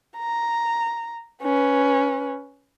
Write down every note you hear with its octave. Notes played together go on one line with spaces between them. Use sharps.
A#5
C#4 B4